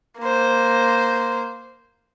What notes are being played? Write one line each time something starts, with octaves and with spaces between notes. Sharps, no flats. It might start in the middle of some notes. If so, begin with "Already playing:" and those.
A#3 C5